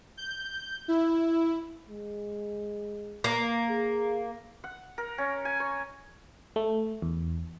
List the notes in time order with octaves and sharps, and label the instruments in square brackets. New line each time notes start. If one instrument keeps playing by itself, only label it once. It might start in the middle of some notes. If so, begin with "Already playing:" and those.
[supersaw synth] G6
E4
[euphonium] G#3
[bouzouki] A#3
[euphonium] G#4
[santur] F#5
A#4
C#4
G#5
C#5
[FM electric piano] A3
E2